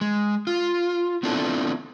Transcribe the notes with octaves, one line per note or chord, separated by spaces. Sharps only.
G#3
F4
B3 C4 D4 E4 F4 A4